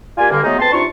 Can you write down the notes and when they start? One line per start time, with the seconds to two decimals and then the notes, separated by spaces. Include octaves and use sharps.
0.18 A#3 F4 G4 D5 G#5
0.31 G2 D3 A#3
0.44 F#3 G#3 A3 B3 D#4
0.60 F2 C4 B4 A5 C6
0.73 C3 D4 D#4 F4 C#6